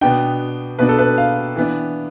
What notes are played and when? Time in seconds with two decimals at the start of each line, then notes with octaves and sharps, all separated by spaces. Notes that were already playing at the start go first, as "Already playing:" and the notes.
0.01 B2 B3 D4 G5
0.78 B2 B3 D4 B4
0.89 A4
0.98 B4
1.18 F5
1.56 E3 B3 D4